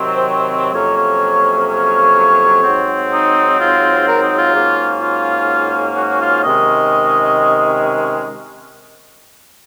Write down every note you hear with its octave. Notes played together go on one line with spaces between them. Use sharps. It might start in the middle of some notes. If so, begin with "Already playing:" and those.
Already playing: C3 D#3 F#3 C4
C5
C#5
F2 C3 F#3 A#3 C#4 C#5
C#5
C#5
G#2 F#3 C4
D#4
F4
A#4
D#4
F4
G#2 F#3 A#3 C#4
F4
F#4
F4
C3 D#3 G#3 C#4 D#5